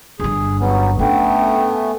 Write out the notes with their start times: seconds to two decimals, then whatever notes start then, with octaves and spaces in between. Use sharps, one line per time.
0.20 G1 G2 G#4
0.61 F#3 B3 C#4
0.99 A3 B3 C#4 D4 G5
1.72 G#5